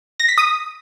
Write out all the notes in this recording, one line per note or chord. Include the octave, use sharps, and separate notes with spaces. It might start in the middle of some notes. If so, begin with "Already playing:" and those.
A#6
B6
D#6